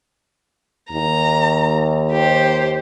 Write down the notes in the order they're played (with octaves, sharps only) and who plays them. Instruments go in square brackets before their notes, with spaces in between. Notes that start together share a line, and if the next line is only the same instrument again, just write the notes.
[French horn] D#2 [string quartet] A#5
[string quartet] G4 C5